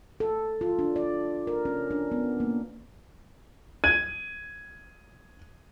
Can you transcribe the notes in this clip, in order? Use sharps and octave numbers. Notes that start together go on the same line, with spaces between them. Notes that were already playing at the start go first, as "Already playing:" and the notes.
A4
F4
D4
D5
A#4
C#4
D4
B3
A#3
G#6 D#7